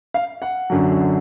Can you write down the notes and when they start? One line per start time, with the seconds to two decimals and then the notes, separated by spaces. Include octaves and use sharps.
0.14 F5
0.42 F#5
0.70 F#2 D3 F#3